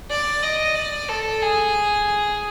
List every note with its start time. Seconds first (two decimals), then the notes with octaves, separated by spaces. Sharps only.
0.10 D5
0.43 D#5
0.76 D5
1.09 A4
1.42 G#4